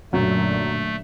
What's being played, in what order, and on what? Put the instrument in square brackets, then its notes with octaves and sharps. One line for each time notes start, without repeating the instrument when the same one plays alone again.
[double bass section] F#2 A#2 D3 [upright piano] F#3 [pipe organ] A3